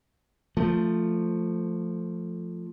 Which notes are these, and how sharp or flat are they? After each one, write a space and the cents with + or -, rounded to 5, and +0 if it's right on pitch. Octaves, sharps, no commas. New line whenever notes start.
F3 +0 A3 +10